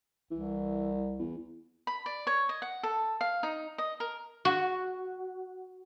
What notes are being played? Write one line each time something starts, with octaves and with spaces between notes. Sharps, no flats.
C2 E3
E2
B5
D5
C#5
D#5
F#5
A4
F5
D#4
D#5
A#4
F#4